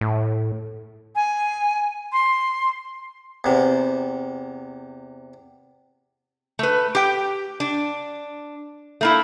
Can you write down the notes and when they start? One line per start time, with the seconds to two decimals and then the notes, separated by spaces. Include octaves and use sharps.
0.01 A2
1.15 G#5
2.12 C6
3.44 E2 C3
6.59 A3 B4
6.95 G4 G5
7.60 D4
9.01 A3 A#3 E4